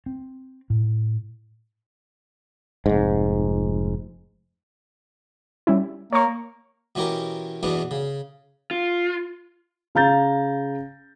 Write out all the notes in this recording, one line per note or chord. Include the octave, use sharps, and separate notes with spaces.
C4
A2
F1 G#2
G3 C#4 E4
A#3 C#5 C#6
B2 E3 C#4 G4 A#4
E2 B2 E3 B3 D4
C#3
F4
C#3 F5 A#5 G6 A6